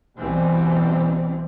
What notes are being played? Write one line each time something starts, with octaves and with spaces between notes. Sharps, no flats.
C2 B2 E3 G3 C4